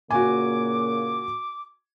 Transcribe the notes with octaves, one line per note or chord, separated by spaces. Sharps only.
A#2 C#3 A#3 F#4 G#5 D6